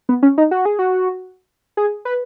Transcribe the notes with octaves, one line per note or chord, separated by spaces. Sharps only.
B3
C#4
D#4
F#4
G#4
F#4
G#4
B4